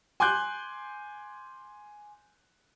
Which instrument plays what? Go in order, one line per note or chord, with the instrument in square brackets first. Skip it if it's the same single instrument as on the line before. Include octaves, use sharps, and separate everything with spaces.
[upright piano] G#5 C6 D6 F#6 G6